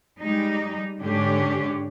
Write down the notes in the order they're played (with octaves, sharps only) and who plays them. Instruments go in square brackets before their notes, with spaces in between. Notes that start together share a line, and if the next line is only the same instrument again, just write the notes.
[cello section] G3 G#3 D#4
G#2 D3 G#3 C#4 D4 G4